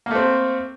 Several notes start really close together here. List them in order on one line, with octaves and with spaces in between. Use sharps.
A#3 A3 C4